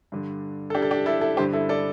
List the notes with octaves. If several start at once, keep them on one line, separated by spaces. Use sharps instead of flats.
G2 D3
A4
D4 G4
A4
D4 G4
E4 A4
E4 A4
G2 D3 G4 C5
E4 A4
A4 D5